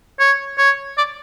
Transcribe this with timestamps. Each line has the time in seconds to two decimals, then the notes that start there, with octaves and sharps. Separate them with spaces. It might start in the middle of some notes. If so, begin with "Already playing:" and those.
0.19 C#5
0.58 C#5
0.98 D5